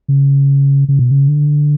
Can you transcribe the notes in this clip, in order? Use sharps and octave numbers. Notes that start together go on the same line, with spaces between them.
C#3
C#3
B2
C#3
D3